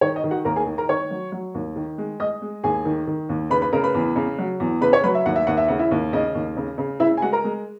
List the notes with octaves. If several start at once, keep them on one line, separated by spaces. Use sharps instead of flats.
D#3 C#5
D#5
D#3
F#4 F#5
D#2 A#4 A#5
G#4 G#5
D#3
A#4 A#5
D#3 C#5 C#6
F#3
F#3
D#2
D#3
G#3
G#3 D#5 D#6
G#3
D#2 G#4 G#5
D#3
D#3
D#2
C#3 B4 B5
B4 B5
C#3 A#4 A#5
B4 B5
E2
C#3
F#3
E2
C#3 B4 B5
C#5 C#6
F#3 B4 B5
E5
D#2 F#5
E5
D#2 F#5
E5
C#3 F#5
E4 E5
D#2
C#3 D#5
D#2
C#3
C#3
C#3 E4 E5
G#5
G#3 F#4 F#5
A#4 A#5
G#3